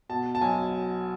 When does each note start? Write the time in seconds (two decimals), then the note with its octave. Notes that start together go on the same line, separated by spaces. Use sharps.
0.09 B2 A5
0.35 A5
0.41 B1 G#5